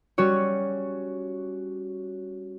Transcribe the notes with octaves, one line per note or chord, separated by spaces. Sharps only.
G3 C#4 F#4 C#5